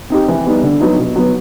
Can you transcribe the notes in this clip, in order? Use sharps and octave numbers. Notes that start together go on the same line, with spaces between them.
C4 D#4 G4
E3
G3 B3 D#4
D3
F#3 B3 D#4
B2
F#3 B3